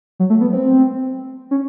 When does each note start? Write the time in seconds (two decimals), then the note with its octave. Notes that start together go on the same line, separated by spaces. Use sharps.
0.20 F#3
0.30 A3
0.41 B3
0.52 C4
1.51 C#4